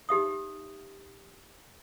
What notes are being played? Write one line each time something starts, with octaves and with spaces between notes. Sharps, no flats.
D#4 G4 E5 D#6